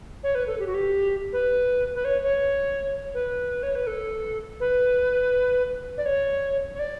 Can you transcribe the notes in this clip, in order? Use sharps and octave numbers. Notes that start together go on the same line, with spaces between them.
C#5
B4
A4
G4
F#4
G4
B4
B4
C#5
C#5
B4
C#5
B4
A4
B4
D5
C#5
C#5
D5